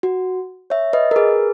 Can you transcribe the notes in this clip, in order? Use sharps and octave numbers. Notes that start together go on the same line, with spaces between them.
F#4
C#5 E5
B4 D#5
A#4
G#4 B4